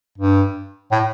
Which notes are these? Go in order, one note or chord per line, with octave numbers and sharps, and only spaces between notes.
G2
A2